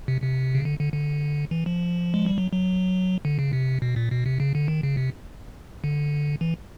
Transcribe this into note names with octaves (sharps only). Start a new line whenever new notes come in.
C3
C3
C#3
D3
D3
D3
E3
F3
G#3
G3
F#3
F#3
D3
C#3
C3
B2
A#2
B2
C3
C#3
D3
D#3
C#3
C3
D3
E3